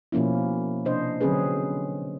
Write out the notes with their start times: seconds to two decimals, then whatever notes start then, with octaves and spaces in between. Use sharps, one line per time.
0.12 B2 F3 A#3 C#4 E4
0.85 C3 D4 C5 D#5
1.21 D3 F#3 C4 C#4 G#4 B4